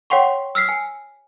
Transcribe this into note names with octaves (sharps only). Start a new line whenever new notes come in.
C#5 F#5 G5 C6 C#6
E6 F6 B6 C7
G#5